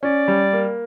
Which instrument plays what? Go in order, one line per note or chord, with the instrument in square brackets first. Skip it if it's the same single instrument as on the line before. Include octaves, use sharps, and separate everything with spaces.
[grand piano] C#4 [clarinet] D5
[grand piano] G3
A#3